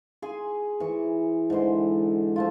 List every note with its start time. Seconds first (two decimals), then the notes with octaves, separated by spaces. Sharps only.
0.22 G#4 G#5 C6
0.80 E3 C#6
1.50 G#2 D3 E3 C6
2.36 F3 A3 F4